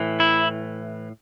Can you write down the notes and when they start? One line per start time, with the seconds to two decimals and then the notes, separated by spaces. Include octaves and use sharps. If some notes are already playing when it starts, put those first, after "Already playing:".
Already playing: A2 E3
0.20 E4